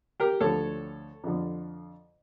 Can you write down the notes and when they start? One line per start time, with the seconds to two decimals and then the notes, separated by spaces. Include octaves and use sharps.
0.20 G4 A#4
0.40 D2 D3 F3 A3 A4 C#5
1.24 F2 D3 F3